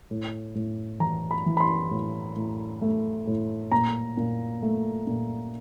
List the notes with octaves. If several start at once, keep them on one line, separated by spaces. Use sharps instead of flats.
A2
A2
E3 A#5
B5
E3
B5
C6
A2
A2
A3
A2
A#2 A#5
A#2
A3
A#2